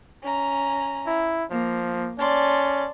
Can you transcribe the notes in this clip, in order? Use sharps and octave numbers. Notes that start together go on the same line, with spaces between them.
C#4 A#5
E4
F3 A#3
C#4 D5 A5 C6